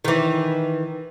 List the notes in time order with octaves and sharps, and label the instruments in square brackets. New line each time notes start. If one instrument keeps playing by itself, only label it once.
[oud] D#3 E3